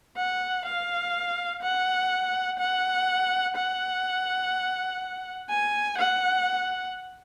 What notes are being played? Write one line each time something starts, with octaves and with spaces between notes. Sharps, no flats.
F#5
F5
F#5
F#5
F#5
G#5
F#5